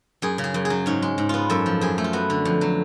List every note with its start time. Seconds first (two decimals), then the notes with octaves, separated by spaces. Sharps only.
0.22 F#2 G#4
0.38 C#3
0.44 G#4
0.54 F#2
0.65 G#4
0.70 F#3
0.86 G#2 C#4
1.02 G#3
1.18 G#2
1.29 B3 F4
1.50 F#2 A4
1.66 F3
1.81 F#2 G#4
1.98 A3
2.04 F4
2.13 B3 F#4
2.30 D3
2.45 F2
2.61 F#3